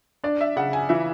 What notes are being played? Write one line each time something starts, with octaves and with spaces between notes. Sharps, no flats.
D4 D5
E5
C#3 F#5
G#5
E3 E5